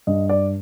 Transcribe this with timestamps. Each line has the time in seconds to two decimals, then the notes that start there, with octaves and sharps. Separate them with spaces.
0.07 G2 D#5
0.29 D5